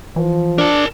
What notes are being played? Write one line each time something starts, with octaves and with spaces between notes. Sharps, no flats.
E3 F3
D4 A#4 A5